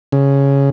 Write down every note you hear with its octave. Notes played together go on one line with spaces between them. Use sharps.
C#3